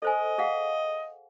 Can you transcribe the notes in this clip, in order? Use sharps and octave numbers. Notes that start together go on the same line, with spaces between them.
A4 C5 D#5 G#5
G#4 F5 F#5